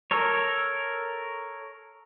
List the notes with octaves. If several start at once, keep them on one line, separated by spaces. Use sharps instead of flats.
A4 A#4 C#5